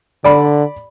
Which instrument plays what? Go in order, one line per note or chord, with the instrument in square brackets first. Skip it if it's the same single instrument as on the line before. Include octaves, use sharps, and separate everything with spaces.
[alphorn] D3 [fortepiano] D5 B5